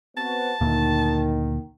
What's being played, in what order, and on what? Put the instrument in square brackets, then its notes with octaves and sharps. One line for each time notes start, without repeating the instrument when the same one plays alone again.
[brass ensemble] B3 C4 F#4 [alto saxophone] A5
[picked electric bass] D2 A#2 [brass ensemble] D#3